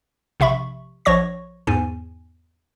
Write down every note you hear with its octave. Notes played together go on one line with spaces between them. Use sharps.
A#1 C3 E5 B5 C#6
A#1 F3 C#5 C#6 A#6
E2 G#2 G#5